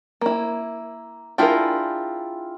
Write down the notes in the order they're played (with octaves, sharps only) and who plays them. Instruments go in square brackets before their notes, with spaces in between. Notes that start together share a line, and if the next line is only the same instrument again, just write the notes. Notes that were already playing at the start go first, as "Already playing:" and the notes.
[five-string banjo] A#3 E4
[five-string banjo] D4 G#4 A#4 [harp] E4 F4 G5